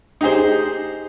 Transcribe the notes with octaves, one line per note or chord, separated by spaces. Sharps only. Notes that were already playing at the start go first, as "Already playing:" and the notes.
D#4 G4 G#4 C5